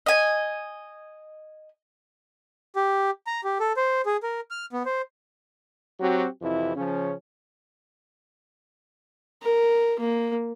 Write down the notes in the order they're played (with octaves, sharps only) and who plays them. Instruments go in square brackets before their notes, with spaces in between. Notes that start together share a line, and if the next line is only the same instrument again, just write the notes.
[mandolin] D#5 G#5
[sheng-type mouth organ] G4
A#5
G4
A4
C5
G#4
A#4
F6
B3
C5
[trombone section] F#3 C4 F#4 G4
F2 C3 E3 E4
C#3 F3 C#4
[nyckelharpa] A#4
A#3